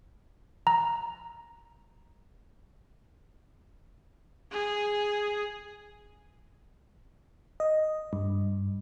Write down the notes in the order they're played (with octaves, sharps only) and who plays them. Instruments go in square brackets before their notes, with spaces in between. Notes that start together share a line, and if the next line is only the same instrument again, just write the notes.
[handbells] A#5
[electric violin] G#4
[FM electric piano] D#5
G2